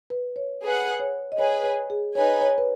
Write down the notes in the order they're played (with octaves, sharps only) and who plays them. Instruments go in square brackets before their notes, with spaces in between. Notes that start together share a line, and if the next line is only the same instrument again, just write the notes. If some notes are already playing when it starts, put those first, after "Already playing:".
[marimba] B4
C#5
[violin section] G#4 B4 F#5
[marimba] C#5
D#5
[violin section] G#4 B4 G#5 [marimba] C#5
[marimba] C#5
G#4
[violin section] D#4 B4 G#5 [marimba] C#5
[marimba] C#5
B4